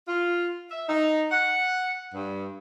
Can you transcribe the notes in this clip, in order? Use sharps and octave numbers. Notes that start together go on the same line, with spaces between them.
F4
E5
D#4
F#5
G2